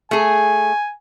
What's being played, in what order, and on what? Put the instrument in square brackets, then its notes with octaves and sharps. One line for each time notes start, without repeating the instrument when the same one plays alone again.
[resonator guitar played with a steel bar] A3 G#4 [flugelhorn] G#5